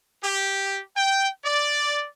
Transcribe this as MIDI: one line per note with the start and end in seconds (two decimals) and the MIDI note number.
0.22 0.80 67
0.97 1.30 79
1.45 2.06 74